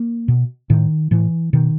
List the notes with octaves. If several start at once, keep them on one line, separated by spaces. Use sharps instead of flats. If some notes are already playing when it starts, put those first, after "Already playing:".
Already playing: A#3
B2
A2 D#3
A2 E3
B2 D#3